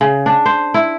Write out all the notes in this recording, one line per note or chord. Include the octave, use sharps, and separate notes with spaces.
C#3
D4
C5
E4